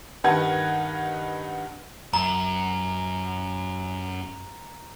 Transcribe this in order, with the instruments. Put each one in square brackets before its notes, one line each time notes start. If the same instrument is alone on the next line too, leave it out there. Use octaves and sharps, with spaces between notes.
[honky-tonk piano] G2 D#3 D#4 B4 F#5 G#6
[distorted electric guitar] F#2 [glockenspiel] A#5